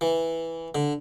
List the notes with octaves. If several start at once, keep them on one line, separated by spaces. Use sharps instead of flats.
E3
D3